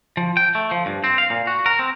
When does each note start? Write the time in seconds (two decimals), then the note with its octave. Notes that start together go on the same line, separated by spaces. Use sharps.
0.17 F3
0.37 G5
0.55 A3
0.71 F3
0.86 G2
1.04 C4
1.18 F5
1.30 A#2
1.47 F#4
1.66 A#4
1.79 C4